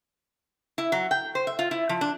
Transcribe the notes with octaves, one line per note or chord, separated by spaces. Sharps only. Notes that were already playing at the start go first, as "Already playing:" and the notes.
E4
F#3
G5
C5
E5
F4
E4
F3
D4